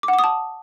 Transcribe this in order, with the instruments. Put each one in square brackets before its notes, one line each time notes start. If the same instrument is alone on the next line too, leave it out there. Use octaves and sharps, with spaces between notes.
[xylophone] D6
F#5
D6
D#6
A5